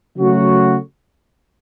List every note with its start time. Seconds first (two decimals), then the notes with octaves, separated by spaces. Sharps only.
0.17 C#3 F#3 A3 F#4